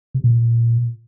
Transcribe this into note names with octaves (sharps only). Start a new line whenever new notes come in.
C3
A#2